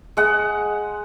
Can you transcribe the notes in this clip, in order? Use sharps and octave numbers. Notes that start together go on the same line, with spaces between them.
G#3 F#5